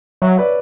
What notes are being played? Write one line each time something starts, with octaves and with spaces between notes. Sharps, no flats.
F#3 C#5 E5
B4 D5